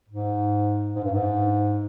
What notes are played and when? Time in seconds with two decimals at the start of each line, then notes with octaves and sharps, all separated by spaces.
0.09 G#2
0.95 G#2
1.04 G2
1.12 G#2